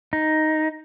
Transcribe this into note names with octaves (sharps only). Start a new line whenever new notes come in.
D#4